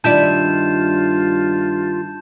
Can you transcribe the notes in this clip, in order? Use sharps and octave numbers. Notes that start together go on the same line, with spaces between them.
G2 D#3 E4 F4 D5 A5 G6 E7